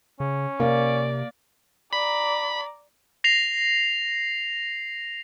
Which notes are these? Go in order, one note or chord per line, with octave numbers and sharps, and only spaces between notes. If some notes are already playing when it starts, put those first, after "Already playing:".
C#3 C#4
C3 A#3 D5
D5 A#5 B5
A#6 C7 F7